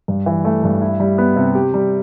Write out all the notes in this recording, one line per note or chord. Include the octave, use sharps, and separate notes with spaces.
G2
E3
A3
G2
E4
G3
B3
C3
G4
G3